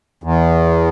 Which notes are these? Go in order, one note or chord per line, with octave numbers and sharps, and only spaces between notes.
E2